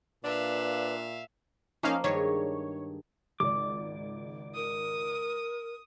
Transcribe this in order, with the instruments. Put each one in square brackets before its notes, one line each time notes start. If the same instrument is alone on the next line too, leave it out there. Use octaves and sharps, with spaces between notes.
[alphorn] A#2 [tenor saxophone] D4 [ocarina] B4 [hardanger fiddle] E5 F5
[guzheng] F3 A#3 [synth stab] C#4 D#4 F5
[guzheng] G2 D#3 [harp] G#3 D4 G#4 [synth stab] C#5
[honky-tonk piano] G#1 C#2 D5 [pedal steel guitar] D6
[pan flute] A#4 [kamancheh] D#6